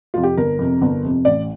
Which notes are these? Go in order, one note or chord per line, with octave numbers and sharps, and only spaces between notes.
F2 C3 F4
G4
G1 A#4
F2 C3
G1
F2 C3
A1 D5